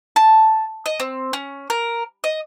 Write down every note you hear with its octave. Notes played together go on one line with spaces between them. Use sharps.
A5
D#5
C4
C#4
A#4
D#5